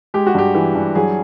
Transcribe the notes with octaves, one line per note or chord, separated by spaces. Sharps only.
G#3 G4
F#4
G2 G4
E3
G2
F#3 G#4